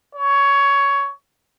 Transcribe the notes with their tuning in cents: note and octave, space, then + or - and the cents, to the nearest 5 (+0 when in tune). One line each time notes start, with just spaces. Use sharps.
C#5 +15